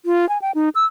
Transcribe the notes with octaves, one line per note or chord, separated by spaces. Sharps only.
F4
G#5
G5
D#4
E6